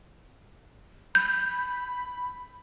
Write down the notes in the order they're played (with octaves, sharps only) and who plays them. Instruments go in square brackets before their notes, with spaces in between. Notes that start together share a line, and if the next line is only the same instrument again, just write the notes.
[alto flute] B5 [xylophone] G6